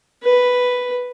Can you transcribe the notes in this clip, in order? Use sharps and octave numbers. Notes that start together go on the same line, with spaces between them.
B4